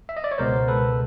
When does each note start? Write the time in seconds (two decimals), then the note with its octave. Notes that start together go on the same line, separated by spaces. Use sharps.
0.09 E5
0.17 D#5
0.24 D5
0.31 C#5
0.38 C#2 B2 G#3 B3 A#4 C5
0.68 A4 B4